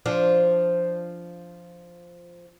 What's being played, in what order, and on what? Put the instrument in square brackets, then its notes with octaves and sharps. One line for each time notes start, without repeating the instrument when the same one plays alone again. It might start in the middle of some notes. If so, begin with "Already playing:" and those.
[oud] F3 D4